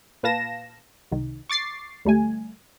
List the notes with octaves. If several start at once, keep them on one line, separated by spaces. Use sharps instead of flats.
A#2 B4 F5 A5 A#6 E7
C2 D#3
C#6 D6 A6 C7
D2 G3 A3 G#5